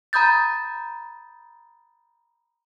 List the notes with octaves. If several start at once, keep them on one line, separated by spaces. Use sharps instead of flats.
A#5 B5 D#6 G6 A6